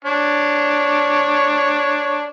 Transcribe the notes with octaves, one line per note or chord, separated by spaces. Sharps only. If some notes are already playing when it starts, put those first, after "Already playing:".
D4 C#5